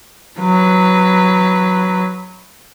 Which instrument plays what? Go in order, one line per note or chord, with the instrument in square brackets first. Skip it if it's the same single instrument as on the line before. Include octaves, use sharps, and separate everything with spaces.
[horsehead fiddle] F#3 B4